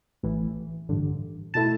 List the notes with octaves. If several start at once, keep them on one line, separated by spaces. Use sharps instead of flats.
A1 A2 E3
A1 G2 D3
B2 A3 E4 A5